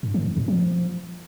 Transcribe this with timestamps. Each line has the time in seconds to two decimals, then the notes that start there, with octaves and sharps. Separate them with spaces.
0.03 G2
0.14 D#3
0.26 F2
0.37 A2
0.48 F3